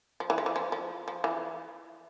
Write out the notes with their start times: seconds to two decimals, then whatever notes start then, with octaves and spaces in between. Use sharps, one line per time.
0.20 F3
0.30 E3
0.38 F3
0.46 E3
0.56 F3
0.72 F3
1.08 F3
1.24 E3